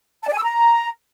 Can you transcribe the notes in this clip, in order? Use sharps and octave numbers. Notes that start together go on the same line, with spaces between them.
A5
D5
G#5
E6
A#5